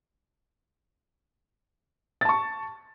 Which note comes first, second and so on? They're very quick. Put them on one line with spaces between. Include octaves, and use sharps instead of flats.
A6 A5 C#6